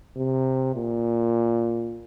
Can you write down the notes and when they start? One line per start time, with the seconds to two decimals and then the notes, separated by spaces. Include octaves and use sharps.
0.17 C3
0.76 A#2